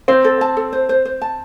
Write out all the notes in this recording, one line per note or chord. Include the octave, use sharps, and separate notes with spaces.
C4 C5
A4
A5
A4
C5
C5
C5
A5